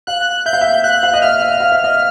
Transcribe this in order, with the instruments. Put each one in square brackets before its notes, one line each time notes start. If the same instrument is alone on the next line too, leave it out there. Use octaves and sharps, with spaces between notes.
[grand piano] F5 [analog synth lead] F#6
[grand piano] E5 [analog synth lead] G6
[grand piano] F5
E5
[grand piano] F5 [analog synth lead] F#6
[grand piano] F5
D#5
[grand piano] E5 [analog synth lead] F6
[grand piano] E5
F5
E5
D#5